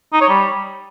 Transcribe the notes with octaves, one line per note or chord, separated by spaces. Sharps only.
D#4
C#5
G3